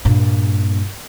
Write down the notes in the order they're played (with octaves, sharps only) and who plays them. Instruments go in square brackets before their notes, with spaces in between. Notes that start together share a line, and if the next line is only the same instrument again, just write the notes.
[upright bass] G2 A#2